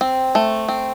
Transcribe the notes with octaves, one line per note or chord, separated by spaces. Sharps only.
C4
A3
C4